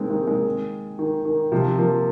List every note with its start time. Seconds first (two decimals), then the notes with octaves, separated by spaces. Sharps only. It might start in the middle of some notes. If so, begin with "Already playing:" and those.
Already playing: D#3 G#3 A#3 C4 D#4
0.10 D#3 G#3
0.23 A#3
0.27 D#3 G#3
0.99 D#3
1.25 D#3
1.52 C3 F3
1.78 F3 A#3